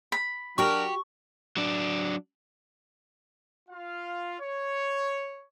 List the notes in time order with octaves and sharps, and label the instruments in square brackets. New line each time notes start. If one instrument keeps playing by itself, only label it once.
[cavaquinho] B5
[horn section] F#3 D4 A#4 [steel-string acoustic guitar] F#4 G4 [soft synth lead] C#6
[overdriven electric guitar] F#3 D4
[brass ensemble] F4 F5
C#5